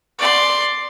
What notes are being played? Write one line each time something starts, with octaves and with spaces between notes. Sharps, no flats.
D5 C6